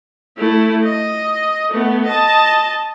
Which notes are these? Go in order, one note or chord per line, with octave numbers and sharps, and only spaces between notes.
A3 E4
D#5
A3 B3
D#5 A5